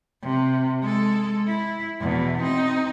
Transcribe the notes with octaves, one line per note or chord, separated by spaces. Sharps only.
C3
G#3 A4
E4
E2 B2
C4 D#4